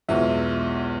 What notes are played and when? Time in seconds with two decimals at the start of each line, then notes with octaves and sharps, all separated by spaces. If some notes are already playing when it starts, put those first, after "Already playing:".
0.09 B1 E2 G#3 B3 F4 E5